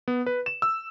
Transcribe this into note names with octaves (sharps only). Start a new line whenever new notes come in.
B3
B4
E7
E6